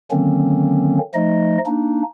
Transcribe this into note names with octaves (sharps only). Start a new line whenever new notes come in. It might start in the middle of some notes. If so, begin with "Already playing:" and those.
D3 D#3 F#3 A#3 C4 C#4
F3 A3 D#4 D#5
A#3 D4 D#4